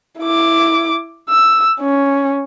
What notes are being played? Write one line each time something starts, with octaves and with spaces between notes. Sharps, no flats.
E4 D6
E6
C#4